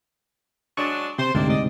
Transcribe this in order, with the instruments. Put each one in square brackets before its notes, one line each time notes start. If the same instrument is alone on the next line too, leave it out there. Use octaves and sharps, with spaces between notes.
[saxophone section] F#3 G#3 D4 [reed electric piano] C#6
[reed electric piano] C3 [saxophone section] C5
[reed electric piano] D2 G#2 C3 [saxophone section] A#3 C4 D4
[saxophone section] D5 D#5